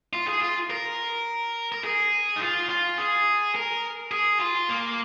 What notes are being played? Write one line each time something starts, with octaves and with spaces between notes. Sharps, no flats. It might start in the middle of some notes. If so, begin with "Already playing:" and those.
F4
G#4
F4
A#4
A#4
G#4
D#4
F4
F4
G#4
A#4
G#4
F4
A#3